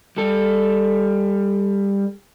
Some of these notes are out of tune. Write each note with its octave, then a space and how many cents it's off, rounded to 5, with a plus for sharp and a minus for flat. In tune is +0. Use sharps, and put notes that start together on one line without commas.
G3 +20 A4 +0